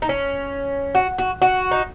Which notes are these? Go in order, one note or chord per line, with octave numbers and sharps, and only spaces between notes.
D#4
C#4
F#4
F#4
F#4
D#4